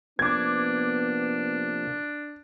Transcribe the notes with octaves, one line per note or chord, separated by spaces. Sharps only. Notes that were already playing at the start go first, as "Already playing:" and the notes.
C3 F3 A#3 B3 D4 D6 G#6